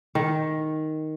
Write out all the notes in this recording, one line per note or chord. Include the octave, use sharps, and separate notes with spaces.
D#3